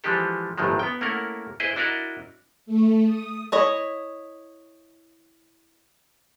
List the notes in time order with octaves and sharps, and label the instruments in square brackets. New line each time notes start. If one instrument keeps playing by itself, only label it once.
[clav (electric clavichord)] E3 F3 G#3 D4 G4 A4
G1 A2 D#3 F3 F#3 G#3
B3 G5
A3 A#3 C#4 E4 A#4 F#5
E4 G#4 B4 C5 D#5
D4 E4 F#4 A#4 D5 D#5
[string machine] A3
D#6
[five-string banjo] E4 C#5 D#5